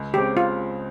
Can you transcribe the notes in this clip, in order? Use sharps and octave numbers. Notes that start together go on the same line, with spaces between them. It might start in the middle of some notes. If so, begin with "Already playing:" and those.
Already playing: C#2
C#3 G#3 C4 G4
F4